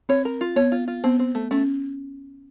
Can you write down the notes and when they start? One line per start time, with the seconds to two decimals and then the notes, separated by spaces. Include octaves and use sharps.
0.09 C4 C#5
0.25 A#4
0.41 F4
0.56 B3 C#5
0.72 F4
0.88 F4
1.04 B3 C4
1.19 C4
1.35 A3
1.51 A3 C#4